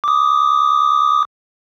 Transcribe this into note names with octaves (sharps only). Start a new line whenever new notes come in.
D6 D#6